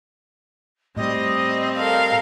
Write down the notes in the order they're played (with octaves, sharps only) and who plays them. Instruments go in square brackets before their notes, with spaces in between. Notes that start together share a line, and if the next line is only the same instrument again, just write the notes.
[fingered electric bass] A2 [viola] G3 C4 [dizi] D#5
[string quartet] A4 A#4 F5